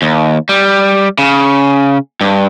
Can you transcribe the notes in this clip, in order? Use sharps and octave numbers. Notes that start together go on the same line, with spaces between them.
D#2
G3
C#3
G2